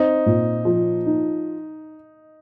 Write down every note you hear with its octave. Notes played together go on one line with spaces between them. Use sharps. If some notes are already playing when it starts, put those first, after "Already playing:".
Already playing: C4 D#4
A#2
F3
D#4